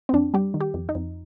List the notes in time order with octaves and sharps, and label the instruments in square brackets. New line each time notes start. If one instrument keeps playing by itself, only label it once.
[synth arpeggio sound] C4
F2 D4
G3 G4
D#3
G4
F2
D#4
F2